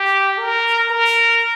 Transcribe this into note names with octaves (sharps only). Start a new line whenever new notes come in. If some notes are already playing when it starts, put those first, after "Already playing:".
Already playing: G4
A#4
A#4